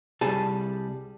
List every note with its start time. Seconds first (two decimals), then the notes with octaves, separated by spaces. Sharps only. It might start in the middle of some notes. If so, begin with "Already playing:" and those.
0.21 C2 G3 G#4 G#5 A5